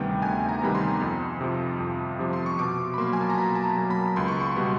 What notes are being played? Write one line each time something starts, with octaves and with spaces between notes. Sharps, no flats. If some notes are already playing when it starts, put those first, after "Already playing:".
Already playing: D2 C3 D#3 G3 B3 G5
D2 G#5
A#5
C3 D#3 G3 B3 B5
C6
F2
C3 F3
F2
C3 F3
C6
C#6
B2 D6
B5
F#3 A#3 C6
G#5
A5
A#5
B2 B5
A5
A#5
F#3 A#3
B5
C#2 C6
C#6
C6
B2 G3 B3